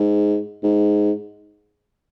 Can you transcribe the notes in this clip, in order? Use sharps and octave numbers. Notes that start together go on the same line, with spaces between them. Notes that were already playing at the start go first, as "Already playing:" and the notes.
Already playing: G#2
G#2